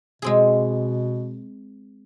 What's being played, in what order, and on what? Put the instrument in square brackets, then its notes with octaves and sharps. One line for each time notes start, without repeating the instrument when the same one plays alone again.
[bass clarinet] B2 [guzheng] G#3 C4 G#4